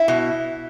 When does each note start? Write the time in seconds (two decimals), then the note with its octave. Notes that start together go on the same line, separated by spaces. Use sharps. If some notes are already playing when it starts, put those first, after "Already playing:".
Already playing: E4
0.08 B2